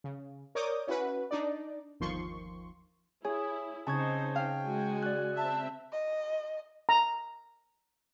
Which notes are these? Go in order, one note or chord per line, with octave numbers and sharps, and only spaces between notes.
C#3
A#4 C#5 D5 D6 D#6 G6
C#4 E4 F#4 B4
D4 D#4 D5
G1 D#2 D#3 F3 C6 C#6
E4 G#4 C#5
C#3 C4 D#4 C5 A5 C#6 G#6
F5 G5
G#3 F#4 G#5
D5 F#6
C4 E5 A5
D#5
A#5